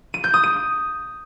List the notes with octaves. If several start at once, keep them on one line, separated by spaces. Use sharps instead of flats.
D#7
G6
D#6
D#7